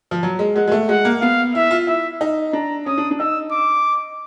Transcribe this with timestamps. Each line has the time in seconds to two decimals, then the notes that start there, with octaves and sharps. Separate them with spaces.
0.11 F3
0.23 F#3
0.39 G#3
0.56 G#3 F#5
0.68 G#3
0.72 A3
0.89 G#3 F#5
1.05 A#3
1.21 B3 F5
1.55 E4 E5
1.71 F4
1.87 E4 E5
2.21 D#4
2.53 D4 A#5
2.86 C#4 D#6
2.98 D4
3.11 D4
3.20 D#4 E6
3.52 D6